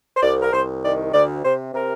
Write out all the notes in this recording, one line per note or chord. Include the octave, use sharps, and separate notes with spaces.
C5
C2 D5
A#4
C2 C5
D#3 D5
D2 D5
C3 C5
C3 A#4